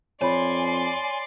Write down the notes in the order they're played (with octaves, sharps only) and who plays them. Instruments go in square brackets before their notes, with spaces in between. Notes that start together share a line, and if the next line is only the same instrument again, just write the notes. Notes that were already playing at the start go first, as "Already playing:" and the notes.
[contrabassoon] F2 [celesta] C#5 B5 [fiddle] D5 C6 [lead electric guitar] G#5